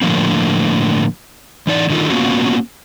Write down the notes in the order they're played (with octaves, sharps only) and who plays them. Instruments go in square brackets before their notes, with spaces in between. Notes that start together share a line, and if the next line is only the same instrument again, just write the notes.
[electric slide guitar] A2 D3 F3 A#3 C4
E3 D#4 D5
D3 D#3 D#4 F4 A4
A#3 B3 C#4 F4 F#4